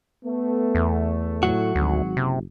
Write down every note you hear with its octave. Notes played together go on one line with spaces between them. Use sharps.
A3 B3
E2
A2 F#3 F#4
G#1 D2
F#1 C3